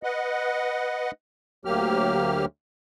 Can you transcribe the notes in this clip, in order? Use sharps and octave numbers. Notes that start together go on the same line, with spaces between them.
B4 D#5 F#5
D2 F#3 A#3 G4 F6